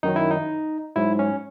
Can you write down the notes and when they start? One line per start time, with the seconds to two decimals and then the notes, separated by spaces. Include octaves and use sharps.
0.03 F#2 D#3 F#3 D#4
0.16 E4
0.31 D#4
0.96 G#2 F#3 E4
1.19 C#4